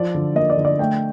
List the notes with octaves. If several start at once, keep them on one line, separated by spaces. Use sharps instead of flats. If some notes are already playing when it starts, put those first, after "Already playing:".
Already playing: F3 D5
D3
A#3 D#5
D5
D3
D5
A3 G5